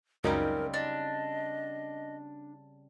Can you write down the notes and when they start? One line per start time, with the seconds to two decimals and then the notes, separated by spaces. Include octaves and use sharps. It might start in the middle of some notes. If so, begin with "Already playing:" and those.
0.24 C#2 F#2 C#3 G3 C4 D#4 A#4
0.74 D4 D#5